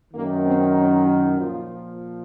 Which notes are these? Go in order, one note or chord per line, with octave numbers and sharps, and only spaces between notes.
F#2 D#3 A#3
C4
C#4
D#4
A#2 F3 F4